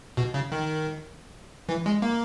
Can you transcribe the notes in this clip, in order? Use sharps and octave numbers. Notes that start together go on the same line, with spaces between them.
B2
C#3
D#3
E3
G#3
A#3